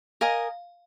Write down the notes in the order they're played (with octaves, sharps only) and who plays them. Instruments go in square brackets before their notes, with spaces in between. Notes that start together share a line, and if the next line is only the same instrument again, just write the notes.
[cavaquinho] A#4 D#5 G#5 [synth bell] F5